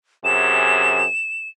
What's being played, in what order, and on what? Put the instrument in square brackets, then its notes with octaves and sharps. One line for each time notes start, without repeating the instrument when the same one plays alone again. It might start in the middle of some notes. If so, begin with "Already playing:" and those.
[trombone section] F#2 C3 G#4 [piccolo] E7